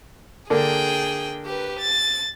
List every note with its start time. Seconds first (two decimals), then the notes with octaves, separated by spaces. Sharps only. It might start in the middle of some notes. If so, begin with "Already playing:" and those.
0.50 D3 A#3 D4 G#4 G5
1.46 G4 B4
1.79 A6